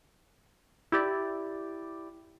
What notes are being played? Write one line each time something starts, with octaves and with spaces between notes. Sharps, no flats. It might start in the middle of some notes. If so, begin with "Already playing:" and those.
E4 G4 D5